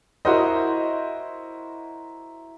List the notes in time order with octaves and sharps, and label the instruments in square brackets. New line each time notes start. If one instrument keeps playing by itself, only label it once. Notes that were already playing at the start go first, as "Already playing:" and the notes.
[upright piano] E4 F#4 A#4 C5 D#5